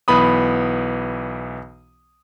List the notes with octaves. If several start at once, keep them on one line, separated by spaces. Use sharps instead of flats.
B1 E3 B3 B5 D#6